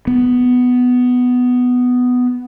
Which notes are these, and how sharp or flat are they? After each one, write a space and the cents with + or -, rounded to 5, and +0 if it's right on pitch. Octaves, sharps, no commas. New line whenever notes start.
B3 +10